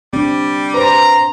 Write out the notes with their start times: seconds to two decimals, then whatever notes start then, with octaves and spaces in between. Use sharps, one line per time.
0.13 G3 C4 D4
0.74 B4 C5 A#5 C6